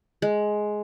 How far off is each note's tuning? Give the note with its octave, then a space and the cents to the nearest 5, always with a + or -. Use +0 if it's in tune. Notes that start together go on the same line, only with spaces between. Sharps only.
G#3 +10